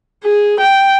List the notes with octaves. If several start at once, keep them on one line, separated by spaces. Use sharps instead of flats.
G#4
G5